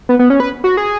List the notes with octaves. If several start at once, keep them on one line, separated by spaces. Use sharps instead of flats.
B3
B3
C#4
B4
F#4
G#4